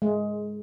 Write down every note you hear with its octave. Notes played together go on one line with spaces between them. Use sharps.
G#3